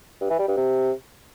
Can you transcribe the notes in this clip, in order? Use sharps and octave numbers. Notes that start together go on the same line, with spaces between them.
G2
E3
G3
G2
C3